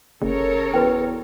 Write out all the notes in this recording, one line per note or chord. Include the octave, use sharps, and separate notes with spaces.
F#1 C#3 A4 A#4 C#5
E2 F#4 B4 G5